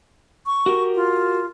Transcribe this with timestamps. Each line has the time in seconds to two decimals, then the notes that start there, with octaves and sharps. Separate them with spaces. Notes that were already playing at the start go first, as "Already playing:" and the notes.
0.46 C#6
0.66 F#4 G4 A#4
0.95 F4